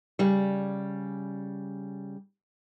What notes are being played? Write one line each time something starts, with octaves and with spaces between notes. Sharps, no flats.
C#3 G3